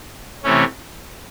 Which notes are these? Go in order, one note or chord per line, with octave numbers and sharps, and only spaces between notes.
C3 E3 A3 C#4